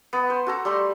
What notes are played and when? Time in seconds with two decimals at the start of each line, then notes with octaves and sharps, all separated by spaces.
0.13 B3
0.30 C5
0.47 F#4 A4 A#5
0.65 G3 A3 C6